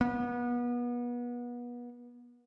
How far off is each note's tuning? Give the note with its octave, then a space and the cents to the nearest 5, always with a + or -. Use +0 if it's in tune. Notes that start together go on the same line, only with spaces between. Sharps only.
B3 -30